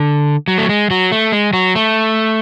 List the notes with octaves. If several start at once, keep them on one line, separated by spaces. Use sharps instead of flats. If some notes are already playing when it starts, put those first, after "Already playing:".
Already playing: D3
F#3
A3
G#3
F#3
A3
G#3
F#3
A3